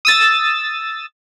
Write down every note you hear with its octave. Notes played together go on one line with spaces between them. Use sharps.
D#6 E6 A6